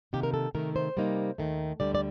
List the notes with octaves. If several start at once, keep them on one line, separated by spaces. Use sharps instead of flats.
C3 D#3 A#3 G4
A#4
A4
C3 D#3 A3 A#4
C5
C3 G3 A#3 D#4
D#2 D#3 A3
D2 D3 G3 D5
D5